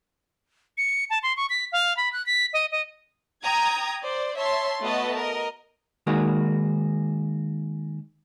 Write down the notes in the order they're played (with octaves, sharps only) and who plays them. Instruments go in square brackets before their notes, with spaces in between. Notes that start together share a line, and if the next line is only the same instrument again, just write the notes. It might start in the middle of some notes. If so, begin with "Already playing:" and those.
[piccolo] C#7
A5
C6
C#6
B6
F5
B5
F#6
B6
D#5
D#5
[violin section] G5 A#5 D#6 G#6
C5 D5
C#5 E5 A5 C6
A3 B3 F#4 B4 D#5 A5
A#4 D#5
[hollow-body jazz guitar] D#3 G#3 A#3 F#4